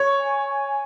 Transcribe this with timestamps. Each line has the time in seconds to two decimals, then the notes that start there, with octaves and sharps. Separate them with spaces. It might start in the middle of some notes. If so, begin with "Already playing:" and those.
Already playing: C#5 C#6
0.19 G#5
0.47 G#5